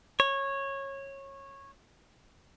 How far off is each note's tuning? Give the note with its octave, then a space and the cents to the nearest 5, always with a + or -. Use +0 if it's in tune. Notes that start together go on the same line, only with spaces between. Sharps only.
C#5 -15